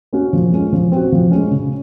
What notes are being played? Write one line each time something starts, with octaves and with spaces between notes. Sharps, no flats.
A#3 C#4 F#4
F3
G#3 C#4 F4
F3
C4 F#4
F3
G#3 C#4
C#3